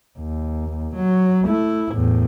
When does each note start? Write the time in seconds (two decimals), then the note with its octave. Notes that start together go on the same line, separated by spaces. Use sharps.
0.19 D#2
0.96 F#3
1.46 A3 E4
1.92 E2 A2